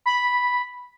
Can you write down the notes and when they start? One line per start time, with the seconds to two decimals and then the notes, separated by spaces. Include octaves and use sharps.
0.06 B5